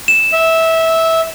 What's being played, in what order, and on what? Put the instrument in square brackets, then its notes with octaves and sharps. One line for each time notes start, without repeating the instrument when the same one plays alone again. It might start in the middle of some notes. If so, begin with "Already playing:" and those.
[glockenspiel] E7
[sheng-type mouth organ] E5